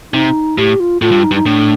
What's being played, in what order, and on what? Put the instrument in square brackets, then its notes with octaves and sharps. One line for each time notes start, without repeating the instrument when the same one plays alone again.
[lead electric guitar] C3 [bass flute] D#4
[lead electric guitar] A2 [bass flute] G4
[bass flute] F4
[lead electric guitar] A2 [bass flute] F4
[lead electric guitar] G2
[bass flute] D#4
[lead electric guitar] G2
[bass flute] D#4
[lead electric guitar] A2 [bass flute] D4